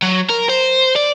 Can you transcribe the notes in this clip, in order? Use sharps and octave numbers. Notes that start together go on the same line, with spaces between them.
F#3
A#4
C5
D5